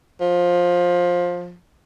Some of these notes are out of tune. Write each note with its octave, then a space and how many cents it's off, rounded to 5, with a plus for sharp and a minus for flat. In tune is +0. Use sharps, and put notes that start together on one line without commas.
F3 +15